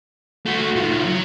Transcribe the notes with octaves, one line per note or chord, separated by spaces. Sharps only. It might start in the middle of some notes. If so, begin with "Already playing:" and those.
A3 F#4
D#3 F3
F#3